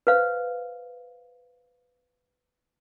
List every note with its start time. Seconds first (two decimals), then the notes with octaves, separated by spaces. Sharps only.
0.07 B4 C5 F5